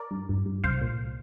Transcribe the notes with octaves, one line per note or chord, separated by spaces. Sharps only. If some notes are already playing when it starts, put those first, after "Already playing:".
Already playing: A#4 D5
G2
G2
G2
C2 C5 F5
A#2